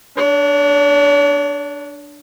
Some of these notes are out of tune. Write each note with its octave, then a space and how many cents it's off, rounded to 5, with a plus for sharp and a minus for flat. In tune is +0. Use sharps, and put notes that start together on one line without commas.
D4 +0 C#5 +45